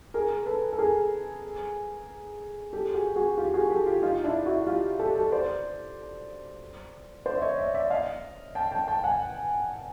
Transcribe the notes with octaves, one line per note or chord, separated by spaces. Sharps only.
G#4 A#4
A4 B4
A4
G#4 A#4
G4 A4
F#4 G#4
F#4 G#4
F4 G4
F#4 G#4
G4 A4
F4 G4
D#4 F4
D4 E4
E4 F#4
F4 G4
G4 A4
G4 A4
C5 D5
C5 D5
E5
C#5 D#5
D5 E5
D5 E5
D#5 F5
G5 A5
G5 A5
G5 A5
F#5 G#5